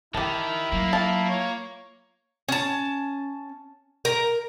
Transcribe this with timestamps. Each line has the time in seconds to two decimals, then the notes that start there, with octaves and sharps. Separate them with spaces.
0.15 D#3 E3 E4 G4 A5
0.72 F#3 A#3
0.93 F4 A5
1.29 C#5
2.49 C#4 A5
4.05 A#4